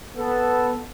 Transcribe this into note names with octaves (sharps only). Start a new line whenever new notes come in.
B3 A4